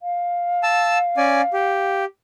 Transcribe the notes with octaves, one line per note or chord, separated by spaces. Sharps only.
F5
A5 E6
C#4 D5 G#5
G4